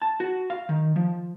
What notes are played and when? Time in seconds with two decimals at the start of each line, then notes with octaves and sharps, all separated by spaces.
0.02 A5
0.20 F#4
0.50 F5
0.69 D#3
0.96 F3